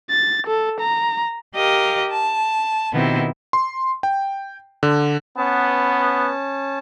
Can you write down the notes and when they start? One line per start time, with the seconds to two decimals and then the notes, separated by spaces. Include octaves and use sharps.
0.10 A6
0.47 A4
0.81 A#5
1.55 G4 A#4 D#5 F5
2.09 A5
2.92 B2 D#3 B3 C4 E4 G4
3.53 C6
4.03 G5
4.83 D3
5.37 B3 C#4 A5